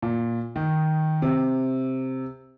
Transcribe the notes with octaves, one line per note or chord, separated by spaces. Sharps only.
A#2
D#3
C3